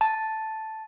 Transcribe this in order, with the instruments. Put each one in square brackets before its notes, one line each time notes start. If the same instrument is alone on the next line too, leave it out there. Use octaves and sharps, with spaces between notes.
[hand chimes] A5